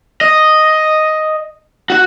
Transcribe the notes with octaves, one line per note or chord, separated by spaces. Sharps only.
D#5
F#4 F#5